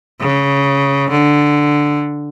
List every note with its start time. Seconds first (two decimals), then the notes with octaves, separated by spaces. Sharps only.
0.20 C#3
1.11 D3